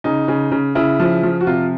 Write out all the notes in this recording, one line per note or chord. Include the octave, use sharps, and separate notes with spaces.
C#3 D#4
C#3
C#3
C#3 E4
F3
F3
F#4
C3 F4